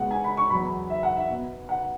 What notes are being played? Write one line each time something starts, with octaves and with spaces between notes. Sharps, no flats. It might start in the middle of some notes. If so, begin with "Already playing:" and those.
Already playing: B2 G#3 B3 F#5
G#5
B5
C#6
E2 B2 F#3 B3 B5
E5
F#5
E5
B2 B3
F#5